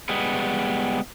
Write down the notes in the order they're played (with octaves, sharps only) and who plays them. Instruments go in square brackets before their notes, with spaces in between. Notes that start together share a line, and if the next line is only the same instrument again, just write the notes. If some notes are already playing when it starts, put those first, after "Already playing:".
[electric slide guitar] G3 G#3 B3